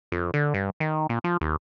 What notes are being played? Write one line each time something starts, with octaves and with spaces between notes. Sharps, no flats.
F2
D3
G2
D#3
A#2
F3
D#2